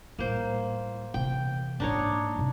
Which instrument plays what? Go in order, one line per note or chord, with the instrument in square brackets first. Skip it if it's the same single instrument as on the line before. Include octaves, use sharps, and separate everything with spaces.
[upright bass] A2 G3 [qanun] A#3 C5
[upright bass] C3 E3 [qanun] G5
[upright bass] G#2 A#3 [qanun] D4 D#4 C#5
[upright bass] F2 C3